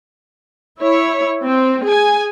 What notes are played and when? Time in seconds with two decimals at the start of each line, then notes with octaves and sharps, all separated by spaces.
0.81 E4 C#5
1.44 C4
1.85 G#4 G#5